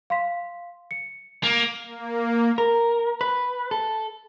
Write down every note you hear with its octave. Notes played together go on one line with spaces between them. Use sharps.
F5 C6 B6
C#7
A#3
A#3
A#4
B4
A4